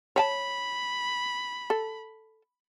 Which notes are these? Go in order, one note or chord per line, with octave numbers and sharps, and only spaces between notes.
C#5 G#5 A5 B5
A4